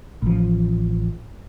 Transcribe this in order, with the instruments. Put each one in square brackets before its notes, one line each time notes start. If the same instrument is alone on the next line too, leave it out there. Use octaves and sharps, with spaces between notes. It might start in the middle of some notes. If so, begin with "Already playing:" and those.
[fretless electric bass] A1 F3